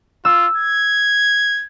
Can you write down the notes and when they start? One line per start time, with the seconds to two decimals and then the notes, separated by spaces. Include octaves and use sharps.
0.25 F4 E6
0.57 G#6